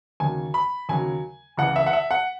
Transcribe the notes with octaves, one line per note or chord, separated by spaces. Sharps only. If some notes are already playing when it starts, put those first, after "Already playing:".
D#2 C#3 F#3 G#5
B5
D#2 C#3 F#3 G#5
C#2 C#3 E3 F#5
E5
F#5
E5
F#5